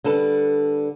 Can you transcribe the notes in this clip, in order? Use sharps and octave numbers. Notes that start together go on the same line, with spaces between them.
D3 G3 A4 B4